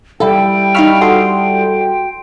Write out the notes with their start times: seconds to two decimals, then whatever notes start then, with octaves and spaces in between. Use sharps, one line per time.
0.20 G3 E4 A4 G5
0.75 D#4 F5 B5 C#6 E6 F6
1.01 F#4 A4 C6 D#6